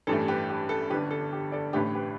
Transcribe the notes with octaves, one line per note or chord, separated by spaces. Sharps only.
A1 G2 E3 A3 A4
G4 B4
G4
A4
G1 G2 G3 D4 G4 B4
A4
G4
A4 D5
A1 A2 A3 D4 G4 B4
G4 B4